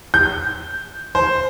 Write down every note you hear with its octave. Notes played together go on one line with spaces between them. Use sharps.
G6
C5